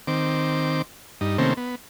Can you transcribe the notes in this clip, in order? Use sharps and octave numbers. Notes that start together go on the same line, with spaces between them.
D#3 C4 D6
G2 D#4
C3 D#3 A3 A#3 C4 C#4
B3